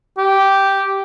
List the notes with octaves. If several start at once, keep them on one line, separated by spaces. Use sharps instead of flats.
G4